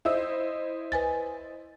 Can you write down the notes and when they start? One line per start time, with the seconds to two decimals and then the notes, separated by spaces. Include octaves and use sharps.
0.05 E4 C5 D#5 E5 E6
0.92 B4 G#5 A6